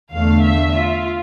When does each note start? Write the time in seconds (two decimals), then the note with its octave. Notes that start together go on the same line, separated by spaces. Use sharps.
0.12 E2 D3 A3 F5
0.43 E5
0.73 F4